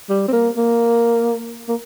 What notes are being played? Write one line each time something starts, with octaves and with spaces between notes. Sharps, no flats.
G3
C4
A#3
A#3
A#3